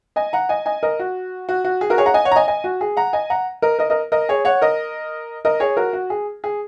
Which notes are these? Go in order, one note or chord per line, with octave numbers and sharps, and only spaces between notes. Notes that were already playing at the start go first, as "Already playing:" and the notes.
D#5 G#5
F#5 A#5
D#5 G#5
D#5 G#5
A#4 D#5
F#4
F#4
F#4
G#4
F#4 A#4
G#4 C#5
F#5 A#5
D#5 G#5
C#5 F#5
A#5
D#5 G#5
D#5 G#5
F#4
G#4
F#5 A#5
D#5 G#5
F#5 A#5
A#4 D#5
A#4 D#5
A#4 D#5
A#4 D#5
G#4 C#5
C#5 F#5
A#4 D#5
A#4 D#5
G#4 C#5
F#4 A#4
F#4
G#4
G#4